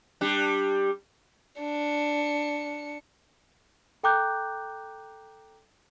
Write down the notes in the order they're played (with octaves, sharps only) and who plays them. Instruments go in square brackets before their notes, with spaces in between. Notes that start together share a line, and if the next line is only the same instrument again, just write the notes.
[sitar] G3 D4
[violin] D4 C#7
[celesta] A4 G5 A#5 D6 F#6 G6